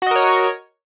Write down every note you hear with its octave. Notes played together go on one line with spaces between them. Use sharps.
F#4 A#4 C#5 D#5